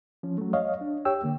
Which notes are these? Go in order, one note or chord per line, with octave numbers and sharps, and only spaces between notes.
F3 C#4
F#3 A3
C#5 D#5 F5
D4
G4 C#5 G5 E6
D3 A#3